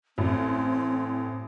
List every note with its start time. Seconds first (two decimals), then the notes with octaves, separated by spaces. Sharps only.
0.18 A1 C4